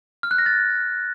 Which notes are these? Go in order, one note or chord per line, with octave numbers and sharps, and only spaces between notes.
F6
F#6
A#6
A6